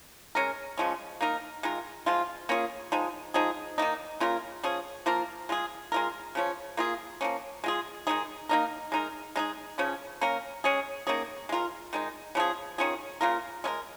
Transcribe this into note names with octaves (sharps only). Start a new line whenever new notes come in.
G#3 C#4 A#4
C#3 F3 G#3 C#4
A#3 D#4 A#4
D#3 G#3 F4 A#4
F3 G#3 F4
A#3 C#4 F4 G#4
F3 G#3 D#4
F3 G#3 D#4 G#4
D#3 A#3 D#4
C#3 A#3 F4 A#4
F3 C#4 G#4
F3 A#3 F4 A#4
G#3 F4 G#4
G#3 F4 A#4
C#3 F3 C#4
A#3 F4 G#4
F3 A#3 C#4
G#3 F4 G#4
D#3 G#3 D#4 G#4
A#3 D#4 A#4
G#3 D#4 A#4
G#3 D#4 G#4
C#3 F3 C#4
A#3 C#4 A#4
G#3 C#4 G#4
D#3 A#3 C#4 G#4
G#3 F4 A#4
D#3 G#3 D#4
C#3 F3 C#4 G#4
D#3 C#4 F4 G#4
C#3 A#3 F4 A#4
G#3 C#4 A#4